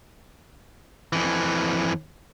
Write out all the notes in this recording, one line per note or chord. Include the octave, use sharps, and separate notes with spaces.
F2 E3